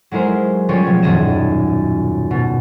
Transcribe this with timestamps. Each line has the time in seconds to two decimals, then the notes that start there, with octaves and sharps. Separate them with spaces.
0.11 F#3 G#3 E4 A#4 C5
0.69 F3 G3 G#3 C#4 G4 C#5
0.87 B2
1.02 D#1 F#2 D#3 D#5 G#6 E7
2.31 B2